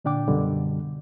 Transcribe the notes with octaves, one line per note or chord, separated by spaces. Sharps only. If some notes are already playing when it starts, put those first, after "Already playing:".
A#2 D3 D4 G5 D6
F#2 B2 D3 G3